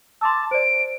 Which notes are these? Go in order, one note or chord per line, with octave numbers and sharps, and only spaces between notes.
A5 C6 D6 E6
C5 D5 D7